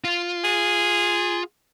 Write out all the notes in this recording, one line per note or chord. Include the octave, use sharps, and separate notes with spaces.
F4
G#4